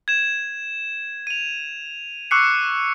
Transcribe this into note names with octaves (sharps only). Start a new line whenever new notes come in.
G#6 E7
D#7 F7
C#6 D6 E6 F#6 C7 C#7